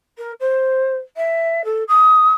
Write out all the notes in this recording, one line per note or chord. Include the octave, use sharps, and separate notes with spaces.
A#4
C5
E5
A4
D#6